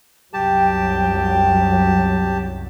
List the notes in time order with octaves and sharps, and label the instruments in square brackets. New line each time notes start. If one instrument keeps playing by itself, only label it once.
[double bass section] C2 F#2 F#3 [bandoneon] G4 A5 [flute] G5